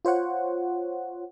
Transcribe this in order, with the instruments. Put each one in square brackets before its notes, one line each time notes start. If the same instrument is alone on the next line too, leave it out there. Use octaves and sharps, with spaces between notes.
[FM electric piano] F4 C5 C#5 F#5